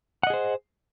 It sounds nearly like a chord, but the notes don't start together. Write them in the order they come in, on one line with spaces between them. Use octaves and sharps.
F#5 D#5 G#4 C5